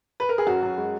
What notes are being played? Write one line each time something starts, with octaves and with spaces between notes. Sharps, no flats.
B4
A#4
G#4
F#2 F#4
F#2
G#3